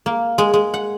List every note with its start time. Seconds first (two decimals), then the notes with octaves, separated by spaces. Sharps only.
0.06 A#3
0.38 G#3
0.53 G#3
0.74 F#5